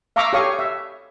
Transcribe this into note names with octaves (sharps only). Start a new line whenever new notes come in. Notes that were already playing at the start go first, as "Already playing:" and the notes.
E5 F5 A#5 C#6 D6 E6
G4 A4 C#5 F5 C#6 D#6
E5